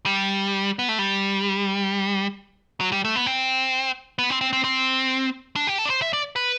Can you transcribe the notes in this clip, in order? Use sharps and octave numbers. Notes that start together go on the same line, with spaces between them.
G3
B3
A3
G3
F#3
G3
A3
B3
C4
B3
C4
C4
C4
C4
D4
G4
A4
D5
C5
E5
D5
B4